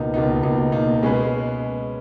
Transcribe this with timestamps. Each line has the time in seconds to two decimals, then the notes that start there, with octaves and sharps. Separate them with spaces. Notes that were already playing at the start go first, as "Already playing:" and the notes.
Already playing: C#2 B2 A#3 D#4
0.14 C#2 B2 A#3 D#4
0.43 C#2 B2 A#3 D#4
0.72 C#2 B2 A#3 D#4
1.02 B2 G#3 C#4 G#4 B4